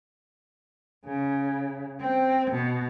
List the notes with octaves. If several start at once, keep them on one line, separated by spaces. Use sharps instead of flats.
C#3
C4
B2